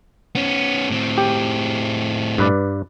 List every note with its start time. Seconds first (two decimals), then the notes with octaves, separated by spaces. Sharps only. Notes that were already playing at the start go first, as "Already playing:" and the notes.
0.35 B3 C#4
0.90 A2 C4
1.18 G4
2.38 G2 B4 D5